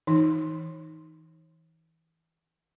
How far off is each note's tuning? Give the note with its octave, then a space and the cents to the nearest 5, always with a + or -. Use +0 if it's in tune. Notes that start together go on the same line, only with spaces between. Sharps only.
E3 -25 D#4 +5